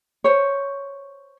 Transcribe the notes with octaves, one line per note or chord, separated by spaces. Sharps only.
C5 C#5